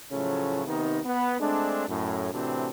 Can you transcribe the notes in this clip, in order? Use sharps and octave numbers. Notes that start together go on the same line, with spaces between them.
A2 C#3 F3 F#3 A3 C#4
C3 D#3 B3 D#4
B3
G#3 A3 C4 D4
F#2 A2
A2 C3 E3 C4 D4 F#4